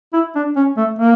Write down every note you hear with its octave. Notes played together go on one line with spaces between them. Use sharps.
E4
D4
C#4
A3
A#3